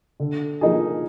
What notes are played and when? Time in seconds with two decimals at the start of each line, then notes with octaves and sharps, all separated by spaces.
0.20 D3
0.61 F3 A#3 D#4 G#4